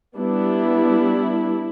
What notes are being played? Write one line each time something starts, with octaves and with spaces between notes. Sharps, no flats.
G3 B3 D4 E4